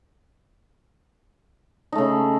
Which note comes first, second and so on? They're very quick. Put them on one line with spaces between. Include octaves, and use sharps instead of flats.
D#4 A3 C#3